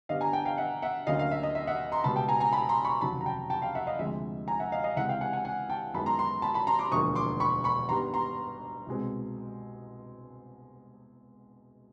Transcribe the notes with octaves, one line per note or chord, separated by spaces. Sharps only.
G2 D3 G3 B3 D#5 F5
G#5 A#5
G5 A5
F5 G5
E5 F#5
E5 F#5
D2 D3 F#3 A#3 C#4 D#5 F5
D#5 F5
E5
D#5
E5
E5 F#5
A#5 C6
C#2 B2 G3 B3 A5 B5
G5 A5
G#5 A#5
G#5 A#5
A5 B5
A#5 C6
B5 C#6
F1 D#2 C#3 F#3 A5 B5
A#5
G5 A5
G5 A5
F5 G5
E5 F#5
D#5 F5
D2 C3 F3 G#3 E5
G#5 A#5
E5 F#5
D#5 F5
D#5 F5
C#2 C3 E3 G#3 E5 F#5
F5 G5
F#5 G#5
F#5 G#5
F#5 G#5
G5 A5
F#2 D#3 G#3 B3 A5 B5
A#5 C6
A#5 C6
A5 B5
A5 B5
A#5 C6
C6 D6
E1 D2 D3 F3 A#3 C#6 D#6
C6 D6
B5 C#6
B5 C#6
G2 D#3 G3 B3 A#5 C6
A#5 C6
C2 B2 G#3 C4